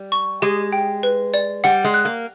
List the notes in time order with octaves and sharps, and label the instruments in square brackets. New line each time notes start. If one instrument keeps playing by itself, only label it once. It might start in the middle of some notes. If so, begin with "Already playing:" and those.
Already playing: [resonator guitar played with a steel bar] G3
[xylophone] C#6
[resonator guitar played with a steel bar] G#3 [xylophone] G4
[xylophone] G5
B4
D5
[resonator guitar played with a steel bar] G3 [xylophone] F#5
[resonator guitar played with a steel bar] G#3
[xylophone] F#6
[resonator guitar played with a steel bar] A#3